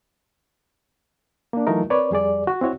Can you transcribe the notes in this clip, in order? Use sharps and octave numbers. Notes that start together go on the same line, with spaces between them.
A#3 D4
E3 F#3 A3 D#4 F4 A#4
C4 A#4 B4 C#5 D5
F2 G3 G#4 D5
F#4
C4 E4 F#4 C#5